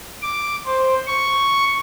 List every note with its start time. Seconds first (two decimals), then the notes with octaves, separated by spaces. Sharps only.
0.22 D6
0.66 C5
1.07 C#6